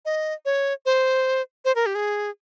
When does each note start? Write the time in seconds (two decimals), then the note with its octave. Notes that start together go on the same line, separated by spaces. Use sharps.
0.05 D#5
0.45 C#5
0.86 C5
1.65 C5
1.76 A#4
1.86 G4
1.95 G#4